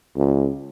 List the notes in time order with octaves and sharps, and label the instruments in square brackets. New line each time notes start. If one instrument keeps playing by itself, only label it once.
[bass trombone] C#2